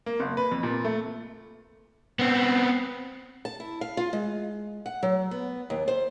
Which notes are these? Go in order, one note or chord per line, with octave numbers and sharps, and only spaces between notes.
A#3
F#1
B4
F2
A#2
A3
B3 C4
A5
E4
F5
F4
G#3
F#5
F#3
B3
D#2
C5